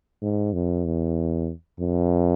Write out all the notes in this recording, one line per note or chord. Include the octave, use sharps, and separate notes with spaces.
G#2
F2
E2
F2